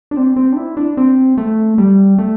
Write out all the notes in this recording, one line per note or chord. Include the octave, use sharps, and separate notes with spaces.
D4
C4
C4
D4
E4
D4
C4
A3
G3
A3